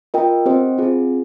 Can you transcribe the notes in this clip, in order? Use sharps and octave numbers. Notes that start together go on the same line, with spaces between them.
F4 A#4 D#5 G5
C4 G4 C5 D#5
C4 F4 G#4